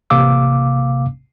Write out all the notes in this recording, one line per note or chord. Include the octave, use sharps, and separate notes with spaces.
A1 C3 A#3 F5 D6 E6